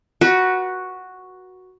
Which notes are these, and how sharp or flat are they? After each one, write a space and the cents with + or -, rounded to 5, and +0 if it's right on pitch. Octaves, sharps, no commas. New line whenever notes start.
F#4 +0 B4 -35